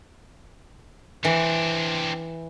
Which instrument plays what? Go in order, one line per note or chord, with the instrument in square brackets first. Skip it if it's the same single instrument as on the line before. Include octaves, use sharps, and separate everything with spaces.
[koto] E3 [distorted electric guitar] C4 D4